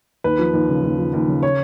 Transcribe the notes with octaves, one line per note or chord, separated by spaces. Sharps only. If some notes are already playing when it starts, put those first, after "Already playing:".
D#2 B4
F3
D#2
C#3
D#2
F3
D#2
C#3
C#5